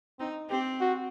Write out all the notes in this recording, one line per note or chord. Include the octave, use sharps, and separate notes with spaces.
C4 D#4
C4 G4
F#4